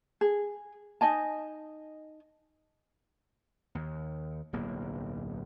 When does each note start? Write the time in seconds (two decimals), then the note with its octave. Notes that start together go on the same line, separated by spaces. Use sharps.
0.21 G#4
1.01 D#4 D#5 G#5 A5
3.75 D#2
4.53 D1 B1 A#3